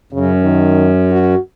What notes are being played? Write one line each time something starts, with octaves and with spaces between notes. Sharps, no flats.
F#2 C#3
D#3
F#4